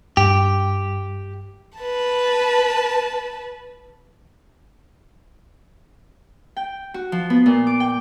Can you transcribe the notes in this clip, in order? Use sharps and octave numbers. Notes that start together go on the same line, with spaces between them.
G2 G4
B4 A5
G5
F#4
F3
B3
A#2
D6
G5